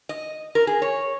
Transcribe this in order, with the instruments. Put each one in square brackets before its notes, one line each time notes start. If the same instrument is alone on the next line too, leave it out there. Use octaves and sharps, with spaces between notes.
[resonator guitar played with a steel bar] D#5
A#4
G#4
C#5